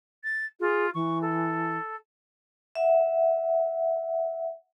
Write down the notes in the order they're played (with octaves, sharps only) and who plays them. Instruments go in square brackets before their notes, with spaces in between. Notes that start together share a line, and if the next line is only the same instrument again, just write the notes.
[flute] A6
[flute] F4 [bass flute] G#4
[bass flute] E3 [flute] C#6
[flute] A4
[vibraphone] E5 F#5